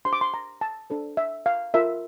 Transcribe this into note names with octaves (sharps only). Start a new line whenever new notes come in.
D4 G4 C5 C6
D6
C6
A#5
A5
D4 A4 C5
E5
F5
F4 A#4 E5